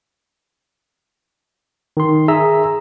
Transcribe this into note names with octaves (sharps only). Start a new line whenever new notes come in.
D#3 C6
G#4 E5 A#5 E6